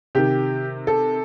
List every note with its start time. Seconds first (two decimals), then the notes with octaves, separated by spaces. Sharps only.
0.15 C3 D#3 G4
0.87 A4